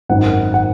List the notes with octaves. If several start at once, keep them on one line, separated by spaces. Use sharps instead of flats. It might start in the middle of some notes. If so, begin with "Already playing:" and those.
G#1 F#2 D#3 F#5
F#5